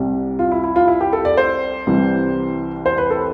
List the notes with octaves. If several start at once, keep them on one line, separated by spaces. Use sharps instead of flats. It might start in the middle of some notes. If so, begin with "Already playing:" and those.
Already playing: C2 C3 G3
F4
E4
E4
F4
E4
G4
A4
D5
C5
C2 C3 E3 G3
C5
B4
A4